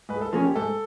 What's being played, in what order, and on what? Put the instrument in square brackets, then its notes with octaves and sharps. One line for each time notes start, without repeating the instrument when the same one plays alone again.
[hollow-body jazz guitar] G#2 [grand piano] B4
[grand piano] G#4
A4
[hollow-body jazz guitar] F3 A#3 C#4 [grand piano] G#4
[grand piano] G4
[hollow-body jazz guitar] G#2 [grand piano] A4